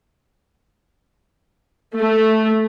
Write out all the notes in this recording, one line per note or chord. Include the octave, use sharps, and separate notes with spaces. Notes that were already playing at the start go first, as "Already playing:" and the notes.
A3